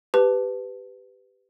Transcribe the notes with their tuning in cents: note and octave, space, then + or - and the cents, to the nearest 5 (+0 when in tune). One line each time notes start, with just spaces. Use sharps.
G4 +0 B4 +15 A5 +0